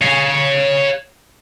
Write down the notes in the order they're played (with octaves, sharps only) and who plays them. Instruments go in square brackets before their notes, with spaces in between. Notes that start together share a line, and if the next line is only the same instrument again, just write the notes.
[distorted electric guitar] C#5 F5